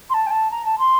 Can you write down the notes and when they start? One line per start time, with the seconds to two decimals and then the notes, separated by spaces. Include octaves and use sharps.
0.09 C6
0.13 A5
0.26 G5
0.30 A5
0.51 A#5
0.65 A5
0.78 C6